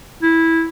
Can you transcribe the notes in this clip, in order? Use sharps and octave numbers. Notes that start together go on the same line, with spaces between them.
E4